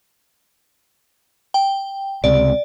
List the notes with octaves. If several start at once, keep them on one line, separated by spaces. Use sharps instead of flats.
G5
C#2 C3 D5